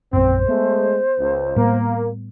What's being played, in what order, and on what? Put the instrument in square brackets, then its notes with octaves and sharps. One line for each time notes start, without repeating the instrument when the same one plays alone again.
[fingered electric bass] A#1 F#2 [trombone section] C4 [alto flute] C5
[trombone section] G#3 A3 [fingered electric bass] B3
[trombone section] C#2
[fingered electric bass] A2 G3 B3 [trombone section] A#3